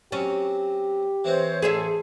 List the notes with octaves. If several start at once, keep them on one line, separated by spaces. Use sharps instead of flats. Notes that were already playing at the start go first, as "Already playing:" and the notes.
F#3 C4 C#4 G4
E3 C4 F#4 C5 C#5
A1 G#4 A4 C5 E5